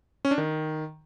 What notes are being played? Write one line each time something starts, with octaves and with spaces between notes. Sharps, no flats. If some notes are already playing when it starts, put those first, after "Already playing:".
C#4
D4
D#3